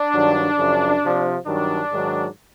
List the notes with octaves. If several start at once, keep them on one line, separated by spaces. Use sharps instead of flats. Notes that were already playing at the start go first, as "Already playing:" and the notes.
Already playing: D4
G2 D#3 F#3
F#2 C#3 F3
C3 F3
G2 D#3 F#3 D4
G#2 D#3 F#3